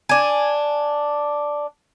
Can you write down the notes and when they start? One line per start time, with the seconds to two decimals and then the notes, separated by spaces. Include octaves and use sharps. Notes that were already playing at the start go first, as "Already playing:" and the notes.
0.09 D4 G#5